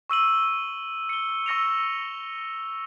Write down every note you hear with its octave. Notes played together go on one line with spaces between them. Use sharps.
C#6 E6 D#7 F#7
C#7 G7
C#6 E6 A#6 C#7 D#7 F7